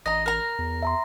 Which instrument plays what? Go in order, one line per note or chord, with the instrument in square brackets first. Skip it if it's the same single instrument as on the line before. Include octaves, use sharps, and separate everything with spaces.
[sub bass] A1 [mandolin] D#5 A#5 [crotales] A#6
[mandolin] A#4 A#5
[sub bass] E2
[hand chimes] E5 A#5 C6